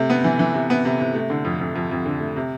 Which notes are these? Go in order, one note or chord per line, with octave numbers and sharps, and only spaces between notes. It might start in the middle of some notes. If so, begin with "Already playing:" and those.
Already playing: C3 A3
B3
E3
E3
C3
B3
C3
C3
A3
D3
F2
F2
F2
F2
D3
A3
C3